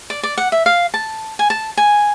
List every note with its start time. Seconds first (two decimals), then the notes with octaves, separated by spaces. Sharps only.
0.10 D5
0.23 D5
0.38 F#5
0.52 E5
0.66 F5
0.94 A5
1.39 G#5
1.50 A5
1.77 G#5